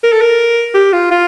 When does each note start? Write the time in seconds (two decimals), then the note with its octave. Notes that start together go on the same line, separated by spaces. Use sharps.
0.03 A#4
0.12 A4
0.21 A#4
0.74 G4
0.93 F4
1.11 F4